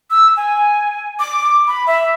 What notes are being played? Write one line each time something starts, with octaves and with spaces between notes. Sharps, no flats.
E6
G#5
D6
B5
E5